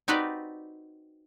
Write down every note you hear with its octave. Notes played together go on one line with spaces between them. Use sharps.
C4 D#4 F#4 G4 B4 D5